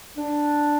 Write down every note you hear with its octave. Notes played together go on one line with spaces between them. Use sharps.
D4